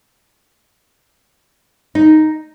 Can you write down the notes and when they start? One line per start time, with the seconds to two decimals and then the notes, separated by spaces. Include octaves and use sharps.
1.95 D#4